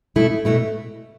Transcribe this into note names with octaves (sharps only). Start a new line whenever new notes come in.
B2 A3 E4
B2 A3 E4